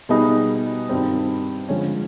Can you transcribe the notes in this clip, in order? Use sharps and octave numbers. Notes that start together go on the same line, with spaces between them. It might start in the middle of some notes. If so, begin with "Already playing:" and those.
B2 G3 B3 D#4 G#4
G2 D#3 G3 C4
D3 F3 G#3 C#4